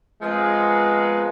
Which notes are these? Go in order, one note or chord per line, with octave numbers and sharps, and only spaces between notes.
F3 G#3 B3 C4 A#4